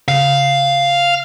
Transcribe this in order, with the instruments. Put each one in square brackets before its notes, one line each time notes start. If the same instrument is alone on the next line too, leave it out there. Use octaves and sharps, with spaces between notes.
[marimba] C#3 [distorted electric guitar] F5